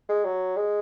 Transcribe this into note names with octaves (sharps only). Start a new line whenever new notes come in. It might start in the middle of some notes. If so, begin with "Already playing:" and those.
G#3
F#3
G#3